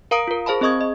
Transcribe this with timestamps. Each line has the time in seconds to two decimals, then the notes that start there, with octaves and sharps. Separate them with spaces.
0.11 A#4 F5 A#5 D#6 D7
0.27 F4 A#4
0.46 G#4 C5 F5 A5 B5
0.61 C4 G#4 D#5 C#6 D#6 G#6
0.81 D#5